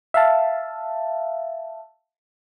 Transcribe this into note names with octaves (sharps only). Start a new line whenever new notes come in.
E5 F5 A5